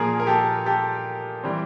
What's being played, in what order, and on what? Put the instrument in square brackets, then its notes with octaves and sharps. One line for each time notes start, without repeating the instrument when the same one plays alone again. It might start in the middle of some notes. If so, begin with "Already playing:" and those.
Already playing: [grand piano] A#2 F3 A#3 G#4 A#4
A#4
G4 A4
G4 A4
E3 G3 C4